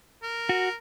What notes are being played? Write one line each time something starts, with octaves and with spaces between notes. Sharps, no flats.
A#4
F#4